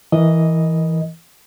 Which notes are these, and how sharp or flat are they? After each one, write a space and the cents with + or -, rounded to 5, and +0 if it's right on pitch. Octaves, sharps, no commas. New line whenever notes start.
E3 -10 A#4 +0 D#5 +0